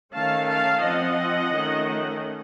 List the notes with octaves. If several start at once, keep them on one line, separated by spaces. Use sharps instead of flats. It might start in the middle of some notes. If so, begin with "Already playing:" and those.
D#3 A3 C#4 F5 A5
F5 A5
F3 C4 D#5 F#5
D#3 A3 C#4